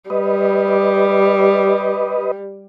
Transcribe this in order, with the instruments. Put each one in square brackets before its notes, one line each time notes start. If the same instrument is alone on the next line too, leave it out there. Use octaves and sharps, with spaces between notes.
[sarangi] G3 [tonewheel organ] B4 D#5